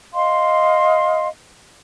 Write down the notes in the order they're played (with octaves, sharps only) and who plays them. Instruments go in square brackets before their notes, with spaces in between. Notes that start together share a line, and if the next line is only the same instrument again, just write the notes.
[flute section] D#5 F5 C6